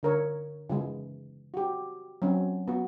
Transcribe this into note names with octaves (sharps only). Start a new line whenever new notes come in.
D3 A#4 C#5
C#3 E3 G#3
F#4 G4
F#3 C4 C#4
B3 F#4